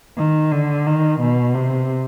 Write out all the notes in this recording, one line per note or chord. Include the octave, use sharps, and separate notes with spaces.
D#3
D3
D#3
B2
C3